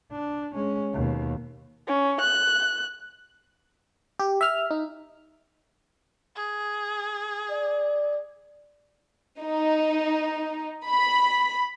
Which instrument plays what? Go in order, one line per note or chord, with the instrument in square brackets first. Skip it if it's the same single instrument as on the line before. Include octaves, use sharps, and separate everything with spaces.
[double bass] D4
G#3 C#4
D#2 B2
[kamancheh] C#4
F#6
[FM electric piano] G4
E5 F6
D#4
[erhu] G#4
[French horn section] D5
[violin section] D#4
B5